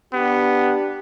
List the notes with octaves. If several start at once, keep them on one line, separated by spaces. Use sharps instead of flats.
B3 D4 G4